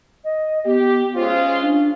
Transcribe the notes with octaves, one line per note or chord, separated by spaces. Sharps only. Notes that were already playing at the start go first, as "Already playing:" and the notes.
D#5
B3 G4
G#3 C#4 F4 C5
D4